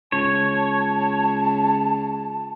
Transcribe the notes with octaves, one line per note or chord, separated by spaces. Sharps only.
C#2 C#5 A5